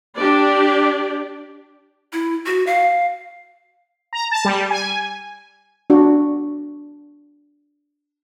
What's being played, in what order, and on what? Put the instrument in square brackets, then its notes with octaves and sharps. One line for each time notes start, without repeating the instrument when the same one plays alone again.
[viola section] D4 G4 D5
[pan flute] E4
F#4
F5
[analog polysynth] A#5
A5
G3
G#5
[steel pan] D4 F#4